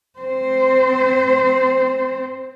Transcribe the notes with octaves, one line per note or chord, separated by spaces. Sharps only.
C4 C5